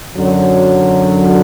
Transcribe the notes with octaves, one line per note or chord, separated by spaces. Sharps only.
F#2 D3 F#3